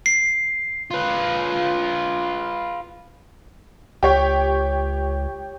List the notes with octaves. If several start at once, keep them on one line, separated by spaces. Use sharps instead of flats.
C7
F4 B4
C#2 G4 C#5 G5